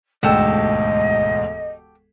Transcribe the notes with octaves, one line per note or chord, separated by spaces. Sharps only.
E1 D2 G#2 F#4 G4 A4 D#5